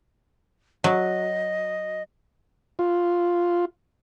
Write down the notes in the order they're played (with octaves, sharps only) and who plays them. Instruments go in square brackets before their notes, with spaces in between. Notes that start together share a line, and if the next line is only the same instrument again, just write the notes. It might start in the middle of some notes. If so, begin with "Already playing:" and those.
[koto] F#3 [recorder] D#5
[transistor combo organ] F4